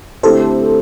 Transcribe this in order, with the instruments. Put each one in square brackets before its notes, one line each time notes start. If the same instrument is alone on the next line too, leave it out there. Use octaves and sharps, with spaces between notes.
[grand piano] D3 A3 C4 E4 G4 [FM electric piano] A4 C5